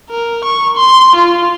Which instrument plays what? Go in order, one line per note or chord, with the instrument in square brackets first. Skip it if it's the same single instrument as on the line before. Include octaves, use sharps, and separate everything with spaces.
[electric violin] A#4
C#6
C6
F4